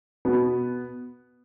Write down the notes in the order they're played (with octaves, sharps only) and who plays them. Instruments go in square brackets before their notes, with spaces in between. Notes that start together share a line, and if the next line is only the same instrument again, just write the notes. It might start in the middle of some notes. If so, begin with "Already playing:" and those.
[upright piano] B2 B3